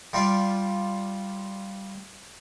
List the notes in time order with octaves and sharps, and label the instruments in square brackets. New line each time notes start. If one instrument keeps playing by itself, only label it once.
[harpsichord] G3 F4 D5 F5